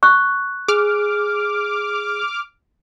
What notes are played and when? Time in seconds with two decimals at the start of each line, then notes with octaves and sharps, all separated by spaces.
0.03 C#6 F#6
0.68 G#4 D6 F6